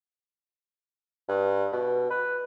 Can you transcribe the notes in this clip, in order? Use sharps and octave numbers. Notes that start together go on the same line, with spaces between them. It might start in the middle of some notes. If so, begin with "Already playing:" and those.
G2
B2
B4